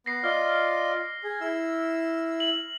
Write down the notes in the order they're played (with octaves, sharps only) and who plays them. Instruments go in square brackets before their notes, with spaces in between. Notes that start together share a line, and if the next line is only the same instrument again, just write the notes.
[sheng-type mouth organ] B3 [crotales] A#6 C7
[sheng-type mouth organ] F4 D5 D#5 [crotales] F6
[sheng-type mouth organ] G#4
E4 E6
[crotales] F#7